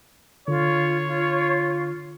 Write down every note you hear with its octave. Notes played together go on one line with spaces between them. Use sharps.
D3 F4 C#5
F4